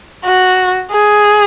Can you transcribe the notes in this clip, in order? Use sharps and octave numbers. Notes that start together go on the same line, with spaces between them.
F#4
G#4